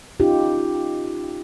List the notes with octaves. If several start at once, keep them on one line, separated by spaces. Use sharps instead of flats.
C#4 D#4 F4 G4